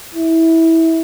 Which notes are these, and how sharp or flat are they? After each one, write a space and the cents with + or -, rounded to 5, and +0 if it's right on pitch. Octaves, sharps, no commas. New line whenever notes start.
E4 -15